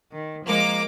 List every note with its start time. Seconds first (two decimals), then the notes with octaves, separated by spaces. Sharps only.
0.12 D#3
0.45 F3 G#3 A#3 D6